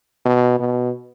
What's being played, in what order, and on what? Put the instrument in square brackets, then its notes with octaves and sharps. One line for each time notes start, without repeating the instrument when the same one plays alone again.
[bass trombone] B2
B2